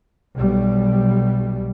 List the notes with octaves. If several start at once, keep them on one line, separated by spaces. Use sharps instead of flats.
B1 B2 G3